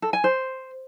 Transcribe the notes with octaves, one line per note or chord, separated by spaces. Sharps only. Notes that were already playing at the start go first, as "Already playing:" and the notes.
A4
G#5
C5